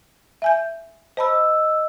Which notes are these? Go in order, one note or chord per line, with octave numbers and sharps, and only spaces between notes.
E5 G#5 G6
C5 D#5 A5 B5 E6